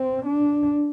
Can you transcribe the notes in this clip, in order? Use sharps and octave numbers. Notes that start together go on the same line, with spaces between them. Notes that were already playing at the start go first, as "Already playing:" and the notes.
Already playing: C4
D4